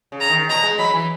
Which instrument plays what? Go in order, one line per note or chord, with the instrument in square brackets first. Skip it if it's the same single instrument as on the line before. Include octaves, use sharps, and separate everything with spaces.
[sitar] C#3
[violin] A#5
[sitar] D#3
[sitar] B2 [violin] A#5
[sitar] G#3
[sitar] F#3 [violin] B5
[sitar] E3